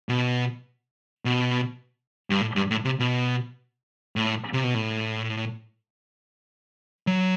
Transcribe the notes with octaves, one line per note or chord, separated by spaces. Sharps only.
B2
B2
G2
A2
G2
A2
C3
B2
A2
C3
B2
A2
F#3